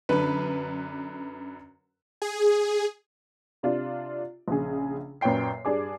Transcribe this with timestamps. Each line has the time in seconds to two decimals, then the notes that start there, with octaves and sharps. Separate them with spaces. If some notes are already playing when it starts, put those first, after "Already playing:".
0.09 F#2 D3 B4
2.22 G#4
3.63 C3 D4 F4
4.48 A#1 C#3 G#4
5.21 F#2 A#2 B4 C#5 G5 C7
5.65 G2 D4 G#4 D6